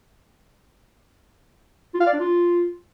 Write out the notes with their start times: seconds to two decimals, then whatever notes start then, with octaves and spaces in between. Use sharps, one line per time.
1.94 F4
2.01 F5
2.07 D5
2.13 D4
2.20 F4